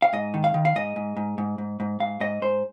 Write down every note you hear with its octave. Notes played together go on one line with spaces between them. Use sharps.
F5
G#2 D#5
D#3
F5
D#3
F5
G#2 D#5
G#2
G#2
G#2
G#2
G#2
G#2 F5
G#2 D#5
G#2 C5